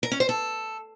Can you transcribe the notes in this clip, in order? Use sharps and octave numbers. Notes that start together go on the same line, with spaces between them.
A#4
C#4
C5
A4